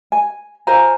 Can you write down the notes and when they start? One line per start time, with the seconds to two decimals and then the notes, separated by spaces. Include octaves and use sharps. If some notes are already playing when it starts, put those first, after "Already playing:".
0.12 G#5
0.67 F4 C5 G#5 A#5